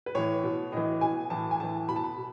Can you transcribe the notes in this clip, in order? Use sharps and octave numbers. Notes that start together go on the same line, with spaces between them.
B4
A2 E3 C#5
B2
A2 E3 D#5
B2 G#5
A2 E3 A5
G#5
A2 E3 A5
B2 B5
A5
B5
B2